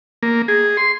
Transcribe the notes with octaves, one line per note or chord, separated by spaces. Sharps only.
A#3
G#4
C6